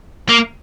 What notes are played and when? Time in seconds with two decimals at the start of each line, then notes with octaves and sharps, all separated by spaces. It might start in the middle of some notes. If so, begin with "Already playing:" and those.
0.29 A#3